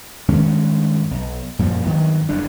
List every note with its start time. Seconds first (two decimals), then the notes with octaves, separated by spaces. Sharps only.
0.28 G2 D#3 G#3 C#4
1.11 B1
1.59 F#2 A#2 F3 G3
1.86 G2 D#3 F#3
2.29 F#1 E2 G3 D4